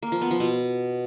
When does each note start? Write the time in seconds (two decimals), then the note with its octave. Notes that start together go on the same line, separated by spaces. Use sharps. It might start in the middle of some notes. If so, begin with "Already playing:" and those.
0.03 A#3
0.12 F3
0.21 B3
0.31 F3
0.40 B2